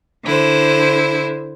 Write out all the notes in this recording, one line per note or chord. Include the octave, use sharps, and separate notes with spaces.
D3 E4 C5